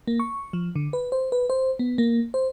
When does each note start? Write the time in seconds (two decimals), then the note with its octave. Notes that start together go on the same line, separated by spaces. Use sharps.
0.07 A#3
0.20 C#6
0.53 F3
0.75 D3
0.93 B4
1.12 C5
1.32 B4
1.50 C5
1.79 B3
1.98 A#3
2.34 C5